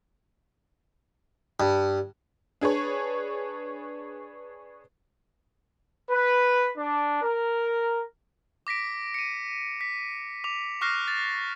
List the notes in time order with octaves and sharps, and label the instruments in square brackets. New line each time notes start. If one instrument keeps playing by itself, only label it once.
[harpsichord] G2
[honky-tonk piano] D4 G#4 B4 C#5
[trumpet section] B4
D4
A#4
[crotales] D6 A#6 B6 D7
C#7 D#7
B6
D6 F7
C#6 D6 F6 F#6 A#6 C7
A6